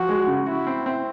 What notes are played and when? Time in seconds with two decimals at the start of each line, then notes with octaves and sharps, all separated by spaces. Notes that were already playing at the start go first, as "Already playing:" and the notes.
Already playing: F3 F#4
0.09 G#3
0.27 C#3
0.47 E4 F#4
0.67 C4
0.86 C4